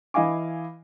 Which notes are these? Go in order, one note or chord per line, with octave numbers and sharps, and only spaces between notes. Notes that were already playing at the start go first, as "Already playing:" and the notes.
E3 E4 D#5 F5 G#5 D6